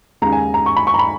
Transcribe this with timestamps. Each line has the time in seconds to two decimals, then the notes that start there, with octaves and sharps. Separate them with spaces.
0.22 D#2 C#3 G#3 A#5
0.32 G#5
0.54 A#5
0.66 C#6
0.77 B5
0.87 C#6
0.94 A#5
0.99 B5